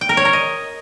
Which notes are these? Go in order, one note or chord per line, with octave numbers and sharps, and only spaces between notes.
G5
A#4
C#5
A#4
D#5